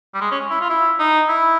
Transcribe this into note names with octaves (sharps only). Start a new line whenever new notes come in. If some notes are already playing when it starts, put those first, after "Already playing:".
G3
G#3
C#4
E4
F4
E4
D#4
E4